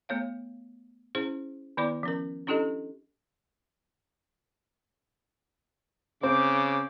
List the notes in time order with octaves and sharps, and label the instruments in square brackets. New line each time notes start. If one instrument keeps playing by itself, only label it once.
[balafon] A3 B3 C#5 F5
C#4 E4 G#4 C5
D#3 B3 E4 D5 B5 D6
F3 C#4 A#4
C#4 D4 E4 G4 A4 D#5
[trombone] C#3 [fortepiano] C4 [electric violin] D6